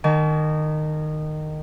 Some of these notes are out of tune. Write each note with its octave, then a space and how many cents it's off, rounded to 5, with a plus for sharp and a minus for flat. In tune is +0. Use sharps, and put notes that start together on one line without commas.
D#3 -20 A5 -45 C#6 +35